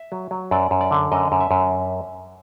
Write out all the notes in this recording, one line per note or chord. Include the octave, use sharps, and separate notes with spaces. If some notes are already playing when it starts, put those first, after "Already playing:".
Already playing: E5
F#3
F#3
F#2 D5
F#2
D5
D3
F#2 D#5
F#2
E5
F#2